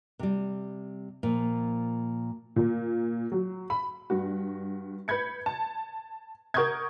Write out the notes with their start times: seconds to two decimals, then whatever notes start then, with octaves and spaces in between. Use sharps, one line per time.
0.19 C3 G3
1.23 A#2 F3
2.56 A#2
3.32 F#3
3.70 B5
4.10 G2 F#4
5.08 B4 B5 G6 G#6 C#7
5.46 A5
6.54 A#4 F#5 C#6 D#6 G6 G#6